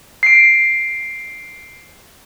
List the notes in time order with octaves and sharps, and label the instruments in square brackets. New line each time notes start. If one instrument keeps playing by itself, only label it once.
[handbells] C7 D7